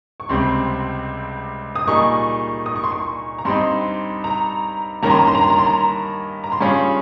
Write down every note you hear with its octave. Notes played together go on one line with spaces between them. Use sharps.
C#6
C#2 C3 G3 C4 C6
D#6
A#2 G3 A#3 D#4 G#4 C#6
D#6
C#6
C6
C#6
A#5
G2 G3 C4 D#4 C6
A#5
G2 D#3 A#3 C#4 A#5
C6
A#5
C6
A#5
C6
A#5
C6
A#5
A#5
C6
G2 G3 C#4 F4 G#4 C#6